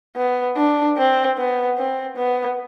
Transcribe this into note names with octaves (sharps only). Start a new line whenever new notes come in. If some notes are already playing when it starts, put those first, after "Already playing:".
B3
D4
C4
B3
C4
B3